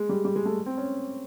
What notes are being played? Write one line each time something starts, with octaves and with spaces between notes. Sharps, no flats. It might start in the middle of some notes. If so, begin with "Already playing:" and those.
Already playing: G#3
G3
G3
G#3
A3
C4
C#4